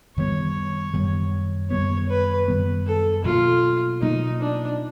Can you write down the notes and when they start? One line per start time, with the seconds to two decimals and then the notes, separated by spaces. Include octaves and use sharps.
0.17 F#2 D#3 G3 B3 C#5
0.93 F#2 D#3 G3 B3
1.71 F#2 D#3 G3 B3 C#5
2.09 B4
2.48 F#2 D#3 G3 B3
2.86 A4
3.24 B2 F#3 A#3 F4
4.02 B2 F#3 A#3 D#4
4.41 D4